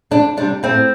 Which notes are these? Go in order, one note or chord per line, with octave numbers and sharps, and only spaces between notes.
F2 D4
C3 G3 D4
A2 C4